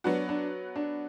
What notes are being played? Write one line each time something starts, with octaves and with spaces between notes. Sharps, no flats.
F#3 B3 D4 F#4
D4
D4